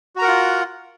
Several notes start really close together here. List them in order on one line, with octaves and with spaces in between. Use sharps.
F#4 A#5 A#4 F#5 F4